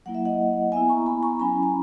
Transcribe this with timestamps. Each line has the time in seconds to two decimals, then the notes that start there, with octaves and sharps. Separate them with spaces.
0.06 F#3 A#3 E4 F#5
0.15 E5
0.25 D#5 F#5
0.72 B3 E4 E5 G#5
0.89 A#5 C#6
1.06 G#5 B5
1.23 A#5 C#6
1.40 F#3 C#4 E4 G#5 B5
1.63 A#5